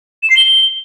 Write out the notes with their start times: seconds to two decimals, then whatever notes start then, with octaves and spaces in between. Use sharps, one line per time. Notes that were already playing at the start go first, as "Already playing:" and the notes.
0.23 E7
0.30 C7
0.37 G7